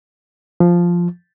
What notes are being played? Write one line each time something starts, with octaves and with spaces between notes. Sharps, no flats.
F3